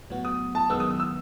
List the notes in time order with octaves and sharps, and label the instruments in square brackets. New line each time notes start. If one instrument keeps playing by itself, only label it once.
[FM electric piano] A2 F#3 B3 F#4
[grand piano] D#6
A5
[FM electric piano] F#2 D#3 G#3 B3 [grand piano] E6
[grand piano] D#6
D#6
E6